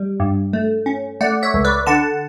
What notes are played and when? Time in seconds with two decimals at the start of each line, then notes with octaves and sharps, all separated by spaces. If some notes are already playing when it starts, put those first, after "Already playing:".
Already playing: G3
0.20 G2
0.53 A3
0.86 C#4
1.21 A3 D5 F#5
1.43 C#5 E5
1.54 C#2
1.65 B4 D5
1.87 D3 F#5 A5